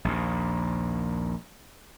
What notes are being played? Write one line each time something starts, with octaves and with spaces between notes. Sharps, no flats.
A#1 D#2